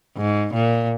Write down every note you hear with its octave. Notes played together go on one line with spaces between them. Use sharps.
G#2
A#2